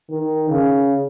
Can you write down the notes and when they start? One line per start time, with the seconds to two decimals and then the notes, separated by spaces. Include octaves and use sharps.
0.11 D#3
0.50 C#3